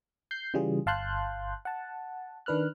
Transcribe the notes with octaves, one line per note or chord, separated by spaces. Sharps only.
G6 C7
C#3 E3 G3 F4 G#4
G1 F5 A5 C6 F#6 G6
F#5 A5
D#3 D4 B4 F6 F#6